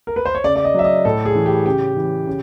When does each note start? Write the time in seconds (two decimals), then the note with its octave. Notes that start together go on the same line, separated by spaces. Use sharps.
0.07 A#4
0.16 B4
0.25 C5
0.35 C#5
0.44 C#3 D5
0.56 D5
0.64 D#5
0.74 F#3 E5
0.84 D#5
1.05 A2 A4
1.25 G#4
1.35 E3
1.46 G4
1.66 C#3 G4
1.97 E3
2.27 C#3